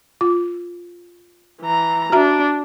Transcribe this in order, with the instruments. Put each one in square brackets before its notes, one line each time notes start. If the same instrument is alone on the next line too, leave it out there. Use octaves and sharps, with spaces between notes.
[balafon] F4
[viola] E3 A#5
[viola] D4 [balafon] F#4 E5 A#5